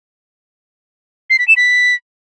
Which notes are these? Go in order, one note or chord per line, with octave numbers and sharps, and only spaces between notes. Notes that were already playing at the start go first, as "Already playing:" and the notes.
C7
B6
E7
B6